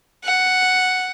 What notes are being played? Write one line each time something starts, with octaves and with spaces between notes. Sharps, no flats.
F#5